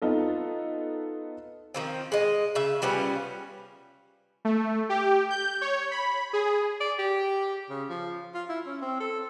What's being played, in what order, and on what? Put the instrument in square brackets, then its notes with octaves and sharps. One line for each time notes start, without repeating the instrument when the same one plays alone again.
[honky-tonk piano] B3 D#4 F4 A4
[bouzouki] D#3 F3 C4
G#3 D#5
C#3 E5
F3 G3 B3 C#4
[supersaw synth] A3
G4
G6
C#5
B5
G#4
[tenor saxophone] D5
G4
C#3
F3
F4
E4
C#4
C4
A4